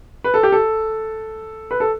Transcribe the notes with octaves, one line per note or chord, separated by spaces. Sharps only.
B4
A4
G4
A4
B4
A4